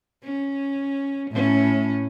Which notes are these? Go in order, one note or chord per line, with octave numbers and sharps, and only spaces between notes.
C#4
A2 C#4